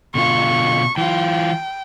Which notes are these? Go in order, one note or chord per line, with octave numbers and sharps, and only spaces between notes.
B2 D3 F4 C#6
E3 F4 G5